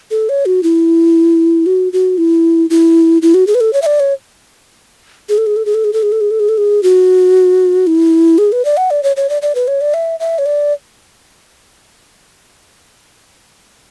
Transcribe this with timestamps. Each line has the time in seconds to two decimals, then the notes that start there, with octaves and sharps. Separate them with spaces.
0.11 A4
0.29 C#5
0.46 F#4
0.63 E4
1.66 F#4
1.93 F#4
2.18 E4
2.70 E4
3.22 E4
3.34 F#4
3.47 G#4
3.55 B4
3.61 A4
3.73 C#5
3.82 E5
3.86 D5
4.00 C#5
5.29 G#4
5.38 A4
5.47 G#4
5.56 A4
5.66 G#4
5.74 A4
5.84 G#4
5.93 A4
6.03 G#4
6.12 A4
6.21 G#4
6.31 A4
6.40 G#4
6.49 A4
6.58 G#4
6.83 F#4
7.87 E4
8.38 G#4
8.52 B4
8.65 D5
8.77 F#5
8.91 D5
9.03 C#5
9.16 C#5
9.29 D5
9.42 D5
9.55 B4
9.68 C#5
9.81 D5
9.94 E5
10.20 E5
10.38 C#5
10.46 D5